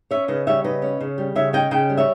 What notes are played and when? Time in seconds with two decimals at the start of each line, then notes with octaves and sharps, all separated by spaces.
0.11 C#4 C#5 E5
0.28 C#3 B4 D#5
0.47 G3 C#5 E5
0.64 C#3 B4 D#5
0.82 C#4
1.01 C#3
1.18 G3
1.36 C#3 C#5 E5
1.53 C#4 D#5 G5
1.71 C#3 D#5 G5
1.90 G3
1.97 C#5 E5